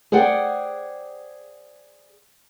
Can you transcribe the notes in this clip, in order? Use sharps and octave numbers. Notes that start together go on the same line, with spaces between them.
G#4 C5 D5 F#5 G5